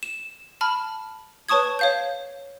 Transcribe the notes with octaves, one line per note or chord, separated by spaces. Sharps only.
E7
A5 B5 F6
B4 C#5 A5 C#6 D#6 G#6
C#5 F5 G6